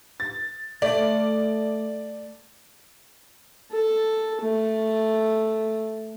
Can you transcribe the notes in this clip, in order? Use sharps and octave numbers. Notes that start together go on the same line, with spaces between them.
A6
A3 D5
A4
A3